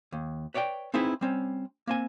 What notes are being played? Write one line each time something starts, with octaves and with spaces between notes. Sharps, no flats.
D#2
B4 C#5 D5 F5 G5
C4 D#4 E4 G#4 B4
G3 C4 C#4
A#3 C4 G#5